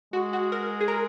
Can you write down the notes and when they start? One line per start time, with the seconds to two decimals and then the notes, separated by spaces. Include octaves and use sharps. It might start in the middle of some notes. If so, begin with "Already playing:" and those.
0.13 G#3 F#4
0.33 F#4
0.52 A#4
0.80 G#4
0.88 A#4